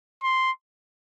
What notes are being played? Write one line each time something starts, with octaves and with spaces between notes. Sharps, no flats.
C6